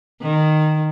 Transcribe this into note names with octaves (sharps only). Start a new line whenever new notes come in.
D#3